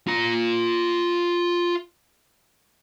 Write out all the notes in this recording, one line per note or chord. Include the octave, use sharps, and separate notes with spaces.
F4 A#5